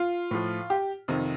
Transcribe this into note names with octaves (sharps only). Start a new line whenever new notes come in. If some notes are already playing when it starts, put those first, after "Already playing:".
Already playing: F4
A2 F3
G4
F2 C3 D#3